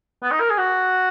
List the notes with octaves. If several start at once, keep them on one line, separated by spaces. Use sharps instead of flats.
B3
D#4
A#4
G#4
F#4